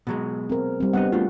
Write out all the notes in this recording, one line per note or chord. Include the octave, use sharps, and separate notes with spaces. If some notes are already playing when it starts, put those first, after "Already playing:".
B2 F#3 G#3
C4 A#4
G3 C4
C2 G3 B3 D4 D#5 F#5
A3 D4 F4 F#4